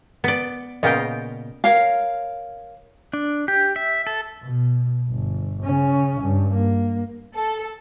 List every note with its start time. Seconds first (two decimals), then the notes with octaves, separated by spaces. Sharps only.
0.24 B3 D5
0.83 A#2 C#3 B3 D#5 F5 G5
1.64 A#4 C#5 F5
3.13 D4
3.48 G4
3.76 E5
4.07 A4
4.43 B2
5.09 G1
5.64 C#3 C#4
6.21 G2
6.53 A#3
7.34 A4